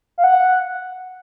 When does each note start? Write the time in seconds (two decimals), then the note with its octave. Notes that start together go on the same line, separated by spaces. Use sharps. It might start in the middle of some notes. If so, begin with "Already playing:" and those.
0.18 F5
0.24 F#5